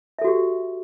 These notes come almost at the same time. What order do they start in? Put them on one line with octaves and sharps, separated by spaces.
E5 A4 F#4 G4